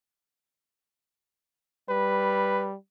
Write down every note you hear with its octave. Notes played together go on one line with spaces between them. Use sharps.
G3 B4